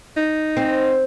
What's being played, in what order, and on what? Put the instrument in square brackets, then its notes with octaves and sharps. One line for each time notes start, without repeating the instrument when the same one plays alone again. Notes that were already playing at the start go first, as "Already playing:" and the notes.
[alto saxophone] D#4
[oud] C4